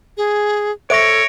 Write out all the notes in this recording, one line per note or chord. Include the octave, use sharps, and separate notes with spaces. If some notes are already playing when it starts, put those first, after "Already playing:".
G#4
A4 C5 C#5 E5 C#6 A#6 D7